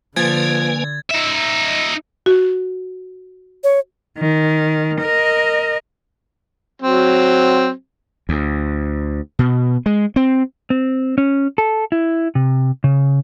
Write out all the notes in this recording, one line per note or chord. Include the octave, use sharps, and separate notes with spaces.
D3 F3 A#3 B4 G#5 G#6 A6
D#4 E5
F#4
C#5
D#3
A#4 D#5
F#3 C4
D2
B2
G#3
C4
C4
C#4
A4
E4
C3
C#3